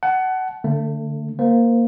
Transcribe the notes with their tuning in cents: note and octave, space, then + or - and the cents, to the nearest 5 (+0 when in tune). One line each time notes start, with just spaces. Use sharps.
F#5 +20 A5 -25
D3 +0 A3 +30
A#3 +0 C5 -15